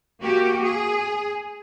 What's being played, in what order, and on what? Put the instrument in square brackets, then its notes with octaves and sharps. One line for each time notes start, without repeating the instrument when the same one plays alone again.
[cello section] A#3 F#4 G4
G#4